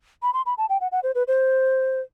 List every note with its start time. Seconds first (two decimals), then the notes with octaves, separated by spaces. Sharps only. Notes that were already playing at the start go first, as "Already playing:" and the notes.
0.22 B5
0.34 C6
0.46 B5
0.58 A5
0.69 G5
0.81 F#5
0.92 F#5
1.03 C5
1.15 B4
1.28 C5